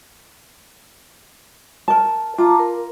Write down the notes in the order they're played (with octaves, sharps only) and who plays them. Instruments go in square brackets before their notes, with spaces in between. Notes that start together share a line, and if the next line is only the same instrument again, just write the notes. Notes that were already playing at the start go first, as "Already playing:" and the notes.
[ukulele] A#4 A5
[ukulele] F4 [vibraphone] A5 A#5 D6
[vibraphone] A#4